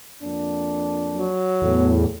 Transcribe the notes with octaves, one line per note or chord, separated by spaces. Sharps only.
F2 A#3 D4
F#3
E2 A2